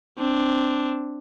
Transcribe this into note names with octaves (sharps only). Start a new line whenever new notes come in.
C4 D4